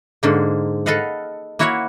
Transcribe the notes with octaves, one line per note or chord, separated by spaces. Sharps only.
G#2 D3 A#3
A4 B4 D#5 F5 F#5
A#3 E4 F#4 C#5 E5 F#5